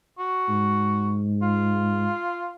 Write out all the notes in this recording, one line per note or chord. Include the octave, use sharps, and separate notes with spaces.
F#4
G#2
F4